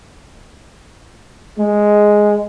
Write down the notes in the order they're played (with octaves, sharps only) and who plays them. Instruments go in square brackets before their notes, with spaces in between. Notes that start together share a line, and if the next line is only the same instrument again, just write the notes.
[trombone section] G#3